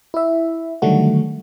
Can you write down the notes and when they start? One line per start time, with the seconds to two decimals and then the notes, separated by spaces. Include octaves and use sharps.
0.14 E4 E5
0.82 D3 D#3 F#3 G3 A3 F#4